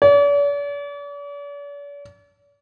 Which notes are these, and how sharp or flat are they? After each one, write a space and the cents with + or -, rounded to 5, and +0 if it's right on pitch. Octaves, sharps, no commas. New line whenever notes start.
D5 -45